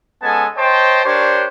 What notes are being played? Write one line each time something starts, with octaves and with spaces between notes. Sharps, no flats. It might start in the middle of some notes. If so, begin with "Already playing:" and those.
G#3 B3 C#4 A4 G#5 A5
C5 C#5 D#5 G5 A5 C6
D4 G4 A#4 C5 C#5